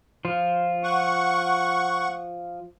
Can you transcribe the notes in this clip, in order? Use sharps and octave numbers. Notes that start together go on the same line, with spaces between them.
F3 F4
F#5 C#6